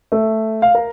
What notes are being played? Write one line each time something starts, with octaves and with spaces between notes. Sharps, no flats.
A3
F5
A#4